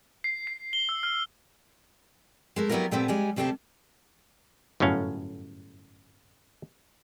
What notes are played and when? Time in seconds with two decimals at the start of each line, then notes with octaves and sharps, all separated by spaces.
0.24 C7
0.47 C7
0.73 G7
0.89 E6
1.03 F6
2.56 G#3 A3 A#4
2.69 F#3 G3 B3 E4 F4 A#4
2.91 A#2 G3 A3 B3 C4
3.08 G3 G#3 G#5
3.36 D2 C3 G3 A3 C4 A5
4.80 G1 F#2 A2 C#4 F5